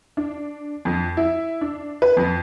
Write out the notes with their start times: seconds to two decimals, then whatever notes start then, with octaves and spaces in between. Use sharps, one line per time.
0.17 D4
0.85 F2
1.17 E4
1.61 D4
2.02 B4
2.17 F2